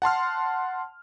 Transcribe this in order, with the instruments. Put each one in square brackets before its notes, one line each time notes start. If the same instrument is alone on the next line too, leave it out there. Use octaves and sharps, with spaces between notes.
[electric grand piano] F#5 A5 C6 F6